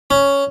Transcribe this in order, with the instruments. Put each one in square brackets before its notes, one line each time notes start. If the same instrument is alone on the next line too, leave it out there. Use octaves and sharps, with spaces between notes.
[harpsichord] C#4